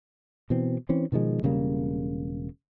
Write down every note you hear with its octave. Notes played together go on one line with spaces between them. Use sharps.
B2 E3 C4
E3 C4 C#4
B2 D#3 F3 G#3
E1 C#3 G3 A#3